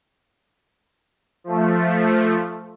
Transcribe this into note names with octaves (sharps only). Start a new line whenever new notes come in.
F3 A3